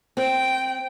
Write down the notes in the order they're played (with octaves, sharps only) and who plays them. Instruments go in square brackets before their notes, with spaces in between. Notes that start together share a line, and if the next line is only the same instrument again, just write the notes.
[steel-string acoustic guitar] C4 [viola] G5